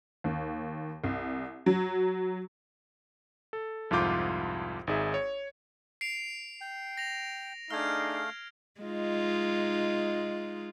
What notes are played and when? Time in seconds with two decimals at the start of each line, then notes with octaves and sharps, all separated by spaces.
0.24 D#2
1.04 C2
1.66 F#3
3.53 A4
3.91 C2 F2 G#2 F4 D6 G6
4.87 G#1 D#4 G#4 E5
5.14 C#5
6.01 C7 D7 F7
6.61 G5
6.97 A#6 F7
7.71 A3 D4 D#4 G#4 F5 F6 G#6
8.81 G#3 D#4 F4